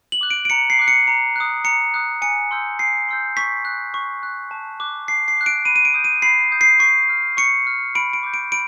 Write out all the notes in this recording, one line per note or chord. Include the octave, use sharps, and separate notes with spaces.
F#7
D6 F#6
D7
D7
A#5 C#7
C7
D6 F#6
C#7
A#5 C#7
D#6 F#6
A#5 C#7
D#6 F#6
G#5 C#7
C6 E6 G6
G#5 C7
C6 E6 G6
C#6 B6
F#6
C#6
F#6
A5
D6 F#6
A5 C7
C7
D6 F#6
D7
B5 D#7
D#7
D7
D#6 G6
D#7
B5 C7
D#6 G6
C7
C#6 C7
F6
C#6 C#7
F6
B5 D7
D7
D6 G6
D7
B5 D7